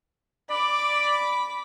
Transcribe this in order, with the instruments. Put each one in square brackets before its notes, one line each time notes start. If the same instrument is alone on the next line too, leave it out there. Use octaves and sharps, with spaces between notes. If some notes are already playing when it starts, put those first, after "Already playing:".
[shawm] D5 [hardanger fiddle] B5 D6